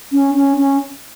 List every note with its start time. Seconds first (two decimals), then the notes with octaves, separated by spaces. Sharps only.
0.12 C#4
0.35 C#4
0.57 C#4